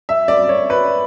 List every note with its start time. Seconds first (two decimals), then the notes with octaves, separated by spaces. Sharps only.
0.09 E5
0.28 D5
0.49 C#5
0.70 B4